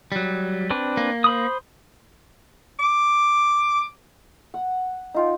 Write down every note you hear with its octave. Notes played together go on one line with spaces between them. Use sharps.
F#3 G3
C4 D4 B4
A#3
C5 B5 D#6
D6
F#5
D#4 F4 G5